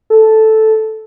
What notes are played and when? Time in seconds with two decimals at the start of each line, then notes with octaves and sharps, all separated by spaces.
0.10 A4